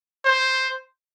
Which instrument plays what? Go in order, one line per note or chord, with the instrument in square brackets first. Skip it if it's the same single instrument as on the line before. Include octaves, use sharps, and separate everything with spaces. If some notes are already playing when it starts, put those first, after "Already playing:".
[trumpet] C5